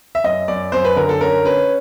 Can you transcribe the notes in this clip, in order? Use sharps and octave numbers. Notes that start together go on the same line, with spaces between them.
E5
F#2 D#5
F#2 D5
F#2 C5
B4
D3 A#4
A4
C#4 A#4
C#4 B4